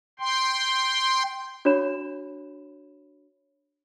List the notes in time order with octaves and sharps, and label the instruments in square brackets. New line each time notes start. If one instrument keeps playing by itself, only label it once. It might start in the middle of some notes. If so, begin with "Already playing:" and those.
[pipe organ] G5 C6
[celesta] D4 F#4 C#5 B5 E7